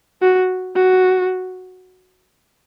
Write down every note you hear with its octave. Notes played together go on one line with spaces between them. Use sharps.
F#4
F#4